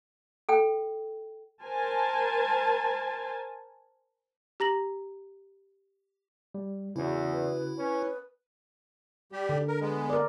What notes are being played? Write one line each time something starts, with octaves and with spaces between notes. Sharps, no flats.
A4 G5
A#4 C5 G#5 A5
G4 A#5 A#6 F#7
G3
E2 C#3 C#4 E4 F#4
B4
C#4 B4
G3 G4
D3
A#4
G#3 B3
A#4 D5